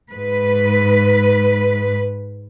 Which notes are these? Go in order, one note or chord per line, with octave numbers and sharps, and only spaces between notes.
G#2 B4